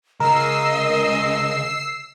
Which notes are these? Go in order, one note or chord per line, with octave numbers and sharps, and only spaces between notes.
C#2 C#3 A#4 D#5 E6 C7